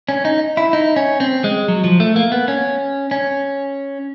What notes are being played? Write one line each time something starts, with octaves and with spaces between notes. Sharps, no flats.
C#4
D#4
E4
D#4
C#4
C4
G#3
F#3
F3
A3
A#3
B3
C#4
C#4